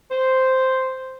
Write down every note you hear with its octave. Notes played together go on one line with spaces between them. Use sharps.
C5